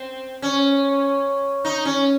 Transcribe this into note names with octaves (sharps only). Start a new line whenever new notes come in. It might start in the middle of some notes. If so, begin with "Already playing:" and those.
Already playing: C4
C#4
D#4
C#4